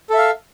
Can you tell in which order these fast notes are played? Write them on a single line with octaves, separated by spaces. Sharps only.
A4 E5 F5